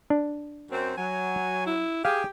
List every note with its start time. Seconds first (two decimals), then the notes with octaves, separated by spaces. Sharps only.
0.10 D4
0.72 F#2 C4
0.97 F#3 G#5
1.66 E4
2.05 G4 G#4 F5